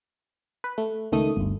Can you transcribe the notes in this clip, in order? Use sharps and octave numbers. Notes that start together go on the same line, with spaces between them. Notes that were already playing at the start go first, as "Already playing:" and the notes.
B4
A3
C#2 D#3 A3 D#6
G1 D2